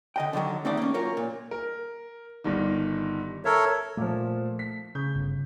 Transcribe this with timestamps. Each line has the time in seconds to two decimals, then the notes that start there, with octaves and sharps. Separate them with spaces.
0.16 D3 D#5 G5
0.33 D3 D#3 F3 F#3
0.65 G3 A3 C4 D#4 D5 F#5
0.77 A#3 C#4
0.94 F#2 F4 A#4 C#5
1.17 A#2
1.51 A#4
2.44 G1 G2 D#3
3.45 A4 A#4 C#5 E5
3.97 A#2 F3 A3
4.59 B6
4.95 C#3 G6
5.15 G1